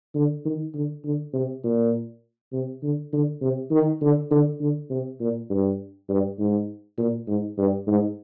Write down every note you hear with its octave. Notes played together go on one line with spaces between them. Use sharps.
D3
D#3
D3
D3
C3
A#2
C3
D3
D3
C3
D#3
D3
D3
D3
C3
A#2
G2
G2
G#2
A#2
G#2
G2
G#2